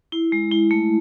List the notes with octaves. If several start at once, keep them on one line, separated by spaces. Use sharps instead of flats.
E4
G#3
E4
A3